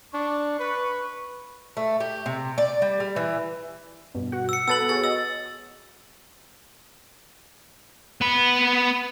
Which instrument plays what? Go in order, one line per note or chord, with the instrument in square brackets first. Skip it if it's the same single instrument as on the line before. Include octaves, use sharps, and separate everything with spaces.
[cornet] D4 [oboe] C#6
[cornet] B4
[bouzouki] A3
G4
C3
D5
G3
G3
E3
[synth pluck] G2 B2
F#4 F#5
[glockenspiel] E6 C#7
[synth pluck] B3 A4 B4 [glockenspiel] E6 A6 F#7
[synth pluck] F#4 G#4 C#5 [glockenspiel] A6
[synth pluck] D#5 [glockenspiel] E6
[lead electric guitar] B3 B5